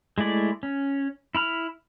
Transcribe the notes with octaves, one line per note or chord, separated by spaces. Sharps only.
G#3 A3 E4 D5
C#4
E4 B5 F6